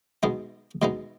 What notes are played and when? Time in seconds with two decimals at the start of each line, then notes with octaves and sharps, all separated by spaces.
0.23 B2 G#3 B3 D#4
0.82 B2 G#3 B3 D#4